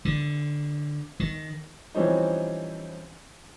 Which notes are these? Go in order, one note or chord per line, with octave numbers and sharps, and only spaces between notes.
D3
D#3
E3 F3 G3 C4 C#4 D#4